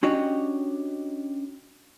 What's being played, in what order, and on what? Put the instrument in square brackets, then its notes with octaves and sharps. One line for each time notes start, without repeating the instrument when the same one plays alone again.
[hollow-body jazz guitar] C#4 D4 F#4 G4 C#5 D#5